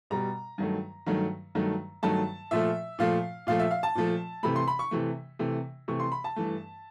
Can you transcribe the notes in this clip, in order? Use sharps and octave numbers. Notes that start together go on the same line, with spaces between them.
B2 G3 A#5
G2 D#3 F#3 A3
G2 D#3 F#3 A3
G2 D#3 F#3 A3
G2 D#3 F#3 A3 A5
A#2 F3 A3 E5
A#2 F3 A3 F5
A#2 F3 A3 F5
E5
F5
A5
A#2 F3 A3
C3 E3 A3 B5
C6
B5
C#6
C3 E3 A3
C3 E3 A3
C3 E3 A3 C#6
C6
B5
A5
G2 E3 A3